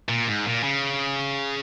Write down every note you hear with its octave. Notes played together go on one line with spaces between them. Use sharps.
A#2
G#2
A#2
C#3